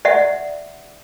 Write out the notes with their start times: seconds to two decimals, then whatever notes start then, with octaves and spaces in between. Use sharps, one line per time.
0.05 D5 E5 F#5